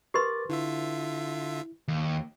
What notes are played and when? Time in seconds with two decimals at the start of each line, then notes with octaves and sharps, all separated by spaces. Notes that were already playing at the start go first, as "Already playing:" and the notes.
0.14 G4 A#4 B4 C6 D6 A6
0.49 D3 E4 F4 E5
1.88 D#2